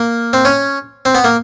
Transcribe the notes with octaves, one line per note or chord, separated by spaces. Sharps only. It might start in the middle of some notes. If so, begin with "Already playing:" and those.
Already playing: A#3
C4
C#4
C4
B3
A#3